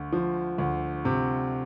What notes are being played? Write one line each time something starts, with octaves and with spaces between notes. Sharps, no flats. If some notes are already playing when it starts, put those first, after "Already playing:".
Already playing: D2
F3
D2
C3